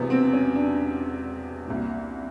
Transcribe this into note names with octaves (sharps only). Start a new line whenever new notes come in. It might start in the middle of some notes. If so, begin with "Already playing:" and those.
Already playing: E1 E2 C3 B3
C4
C#4
D4
C2 A#2